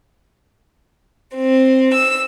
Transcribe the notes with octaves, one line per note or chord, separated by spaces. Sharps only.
C4
E6